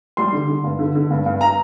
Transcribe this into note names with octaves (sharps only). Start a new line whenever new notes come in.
G3 C6
D3
D3
G2
D3
D3
G2
G2
A#5